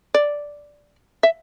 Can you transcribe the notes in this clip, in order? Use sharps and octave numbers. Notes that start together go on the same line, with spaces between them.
D5
E5